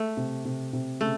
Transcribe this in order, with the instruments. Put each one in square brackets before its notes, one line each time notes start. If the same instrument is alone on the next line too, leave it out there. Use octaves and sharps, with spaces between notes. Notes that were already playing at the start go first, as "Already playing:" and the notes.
Already playing: [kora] A3
[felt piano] C3
C3
C3
[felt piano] C#3 [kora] A3